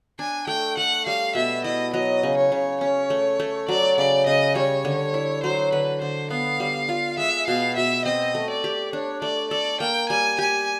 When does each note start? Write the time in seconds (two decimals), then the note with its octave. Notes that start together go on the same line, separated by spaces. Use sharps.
0.19 D4 G#5
0.47 A3 G5
0.77 A3 F#5
1.06 G3 F5
1.35 B2 E5
1.64 E4 D#5
1.93 F#3 D#5
2.23 C#3
2.37 C#5
2.52 C#3
2.81 C#4 C#5
3.10 A3
3.40 A3
3.68 F#3 D5
3.97 C#3 D5
4.26 C#3 D#5
4.55 G3 C#5
4.85 D3
5.14 E4
5.43 F#3 C5
5.72 D3 B4
6.01 D3 C5
6.31 B3 F5
6.60 G3
6.89 F4
7.18 G#3 E5
7.47 B2 F5
7.76 B2 E5
8.05 C4 D#5
8.35 A3
8.50 D5
8.64 G4
8.93 D4 C#5
9.22 A3 D5
9.51 A4 D5
9.80 A#3 G5
10.09 G3 G#5
10.38 G4 G#5